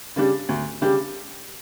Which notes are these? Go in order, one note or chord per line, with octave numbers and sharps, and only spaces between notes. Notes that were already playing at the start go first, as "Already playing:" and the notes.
C#3 G3 D4 G4
D2
C#3 G3 D4 G4